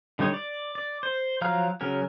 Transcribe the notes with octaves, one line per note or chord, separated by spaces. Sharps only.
D3 G3 D#4 C#5
D5
D5
C5
F3 F#3 F5 A#5 F6
C#3 F#3 C#4 A#4